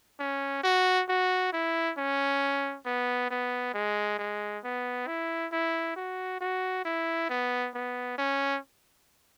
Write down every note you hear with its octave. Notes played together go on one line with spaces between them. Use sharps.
C#4
F#4
F#4
E4
C#4
B3
B3
G#3
G#3
B3
E4
E4
F#4
F#4
E4
B3
B3
C#4